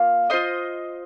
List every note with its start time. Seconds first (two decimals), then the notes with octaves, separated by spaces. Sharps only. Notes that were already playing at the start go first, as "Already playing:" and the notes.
Already playing: A#3 F4 F5
0.30 F4 C5 D#5